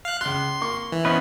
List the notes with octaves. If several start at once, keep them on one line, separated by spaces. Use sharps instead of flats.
F5 F#6
C#2 C6 F#6
A#3 C#6
E3
B3 C#4 B4 C5 D#5 F#5